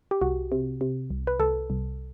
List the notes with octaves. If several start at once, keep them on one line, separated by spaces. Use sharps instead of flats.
G4
C2 F#4
C3
C3
C2
B4
C2 A4
C2